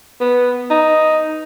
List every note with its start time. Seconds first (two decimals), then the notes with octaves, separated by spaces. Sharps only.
0.21 B3
0.70 D#4